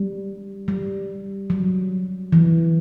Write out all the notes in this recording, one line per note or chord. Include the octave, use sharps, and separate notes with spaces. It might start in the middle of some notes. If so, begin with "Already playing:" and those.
Already playing: G3
G3
F#3
E3